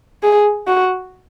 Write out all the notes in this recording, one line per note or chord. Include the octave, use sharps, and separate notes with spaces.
G#4
F#4